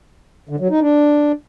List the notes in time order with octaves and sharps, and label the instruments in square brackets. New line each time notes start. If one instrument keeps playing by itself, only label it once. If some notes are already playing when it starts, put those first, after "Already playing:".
[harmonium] D3
F#3
D#4
D4